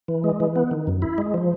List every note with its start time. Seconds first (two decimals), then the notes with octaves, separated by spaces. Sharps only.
0.08 E3
0.24 G#3
0.40 E3
0.56 B3
0.71 D#3
0.87 F#2
1.02 E4
1.18 G#3
1.34 F3